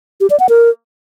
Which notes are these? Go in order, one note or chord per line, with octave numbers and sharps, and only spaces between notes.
G4
D5
F#5
A#4